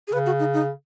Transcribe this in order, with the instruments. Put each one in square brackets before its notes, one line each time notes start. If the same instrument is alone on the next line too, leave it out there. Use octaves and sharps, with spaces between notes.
[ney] G#4
[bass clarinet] C#3 [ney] B4
[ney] F#4
D#4
D#4